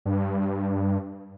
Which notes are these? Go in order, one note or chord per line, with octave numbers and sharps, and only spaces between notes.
G2